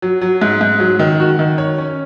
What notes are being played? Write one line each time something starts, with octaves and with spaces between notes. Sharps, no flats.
F#3
F#3
G#2
G#2
F#3
D#3
F#4
D#3
C#5
C#4